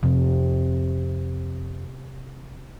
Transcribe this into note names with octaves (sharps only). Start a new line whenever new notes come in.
F2 C3 C4